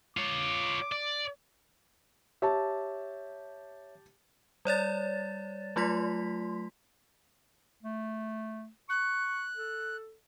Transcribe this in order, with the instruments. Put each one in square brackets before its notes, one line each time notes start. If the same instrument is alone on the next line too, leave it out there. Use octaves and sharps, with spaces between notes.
[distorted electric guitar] F4 C#5 [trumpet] D6
[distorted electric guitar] D5
[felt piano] G4 A5 [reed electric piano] C#5 E5
[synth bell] G3 C#5 D5 A6
F#3 A3 F4 C6 B6
[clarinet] A3
[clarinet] C#6 [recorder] F#6
[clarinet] A4